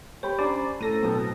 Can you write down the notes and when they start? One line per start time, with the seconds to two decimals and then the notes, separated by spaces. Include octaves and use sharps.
0.23 G4 C#5 G5 B5
0.39 C#4 D4 C5 D5 G#5 A#5 B5
0.81 A2 A4 A#6 D#7
1.03 B2 F#3 C4